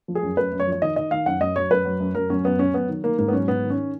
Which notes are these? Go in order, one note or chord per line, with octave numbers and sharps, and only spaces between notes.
F3
G#4
F#2
F#2 B4
F#2
C#5
F3
C#5
D#3 D#5
D#3 D#5
D#3 F5
F#2 F#5
F#2 D#5
F#3 C#5
F#2 B4
F#3
F#2
F#2 A#4
F#3 C#4
F#2 B3
F#3 C#4
F#3 B3
D#3
D#3 A#3
G#2 A#3
B3
F#3 C#4
G#2 B3
D#3
C#4